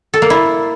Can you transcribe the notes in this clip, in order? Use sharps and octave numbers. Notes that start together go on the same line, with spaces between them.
A4
A#3
E4